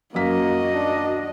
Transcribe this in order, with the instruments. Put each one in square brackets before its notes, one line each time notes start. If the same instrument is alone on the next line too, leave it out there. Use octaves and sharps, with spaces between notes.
[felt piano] F#2 B6 [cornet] A#3 [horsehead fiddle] F#4 D#5
[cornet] D4